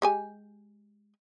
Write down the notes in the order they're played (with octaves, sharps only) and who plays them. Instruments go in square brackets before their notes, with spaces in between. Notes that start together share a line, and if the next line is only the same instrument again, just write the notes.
[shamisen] G#3 G4 G#5